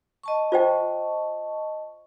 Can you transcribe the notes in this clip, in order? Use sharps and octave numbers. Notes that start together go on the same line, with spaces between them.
D#5 A5 C#6
F4 C5 G5